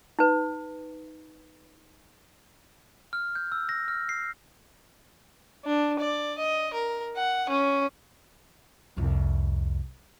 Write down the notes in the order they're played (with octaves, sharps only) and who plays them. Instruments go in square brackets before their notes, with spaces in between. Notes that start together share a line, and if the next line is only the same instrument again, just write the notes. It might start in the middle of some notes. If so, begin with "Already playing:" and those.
[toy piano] D#4 B4
[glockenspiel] F6
G6
E6
A#6
F6
C7
[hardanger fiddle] D4
D5
D#5
A#4
F#5
C#4
[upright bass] C2 F2